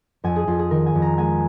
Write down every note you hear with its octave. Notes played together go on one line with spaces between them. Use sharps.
F2 G#5
G#4
F2 F4
G#4
D#3 A#4
G#5
F2
A#5
G#3 G#5